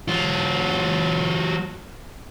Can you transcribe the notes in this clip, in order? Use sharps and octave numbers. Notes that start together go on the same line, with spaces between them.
F#3 F4